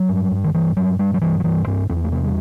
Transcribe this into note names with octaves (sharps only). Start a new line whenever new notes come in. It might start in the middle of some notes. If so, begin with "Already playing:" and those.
Already playing: F#3
G2
G2
D#3
G2 E3
G2 F#3
G2 G3
F#3
G2 E3
F#3
G2 E3
G2 C4
E2 C4
B3
A3
C3 B3
G3